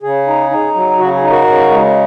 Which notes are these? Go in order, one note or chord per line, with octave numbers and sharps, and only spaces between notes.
C#3 G#4
D#4
D#4
F#3
C#3 F#4
G#4
D#4
F#4 A#4
C#3
G#3